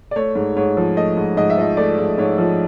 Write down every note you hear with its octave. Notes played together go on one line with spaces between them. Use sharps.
D5
A3 C#5
G#2
G#2 C#5
F3
A3 D#5
G#2
G#2 D#5
E5
F3 D#5
A3 D5
G#2
G#2 C#5
F3